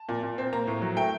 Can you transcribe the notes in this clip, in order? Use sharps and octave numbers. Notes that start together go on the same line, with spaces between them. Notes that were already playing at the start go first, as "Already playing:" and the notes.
Already playing: A5
A#2
A#2
C4
A#3 A#5
A2
F#3
A3 G5